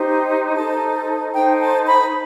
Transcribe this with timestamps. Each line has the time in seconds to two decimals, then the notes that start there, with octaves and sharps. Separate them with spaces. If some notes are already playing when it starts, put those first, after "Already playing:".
Already playing: D#4 G4 C5
0.57 D#4 A4 C5 A5
1.34 D#4 A4 C5 G5
1.60 A5
1.86 B5